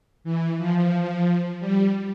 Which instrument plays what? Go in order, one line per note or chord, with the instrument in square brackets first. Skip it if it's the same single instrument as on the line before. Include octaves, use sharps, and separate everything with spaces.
[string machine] E3
F3
G3